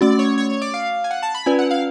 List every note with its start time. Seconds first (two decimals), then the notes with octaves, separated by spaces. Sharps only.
0.01 A3 C#4 F#4 D5
0.19 C#5
0.38 C#5
0.50 C#5
0.62 D5
0.74 F5
1.04 G#5
1.11 F#5
1.23 A5
1.35 B5
1.46 C#4 F4 B4 D5 G#5
1.59 F#5
1.71 F5